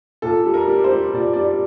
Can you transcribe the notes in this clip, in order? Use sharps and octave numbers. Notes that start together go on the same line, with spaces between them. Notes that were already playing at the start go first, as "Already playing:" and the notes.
A#2 A4
G3
A#4
G3
C5
G3
A#2 D5
D5
G3
D5